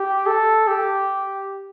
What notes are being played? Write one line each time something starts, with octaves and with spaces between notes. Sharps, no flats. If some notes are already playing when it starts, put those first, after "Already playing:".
Already playing: G4
A4
G4